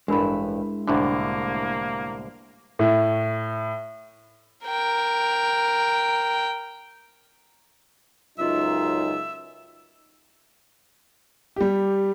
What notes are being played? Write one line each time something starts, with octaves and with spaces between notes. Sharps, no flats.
A1 G2 G#3 D4 E4 A#4 B5
C2 A2 D3 A#3 D4
A2
A#4 G5
C#2 F#2 D#4 F4 E5
G3 G4